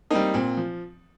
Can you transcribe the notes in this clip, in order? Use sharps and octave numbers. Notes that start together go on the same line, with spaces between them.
G3 A#3 C4 D#4
A#2 C4
F3